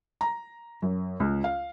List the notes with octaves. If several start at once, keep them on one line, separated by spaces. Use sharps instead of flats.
A#5
F#2
C#2
F5